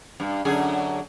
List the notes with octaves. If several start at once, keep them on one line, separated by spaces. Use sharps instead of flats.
G2
F#2 D3 G#4